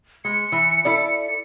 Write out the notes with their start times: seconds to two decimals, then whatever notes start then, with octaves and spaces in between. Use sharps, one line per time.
0.25 G#3 C#7
0.52 E3
0.85 E4 A4 D5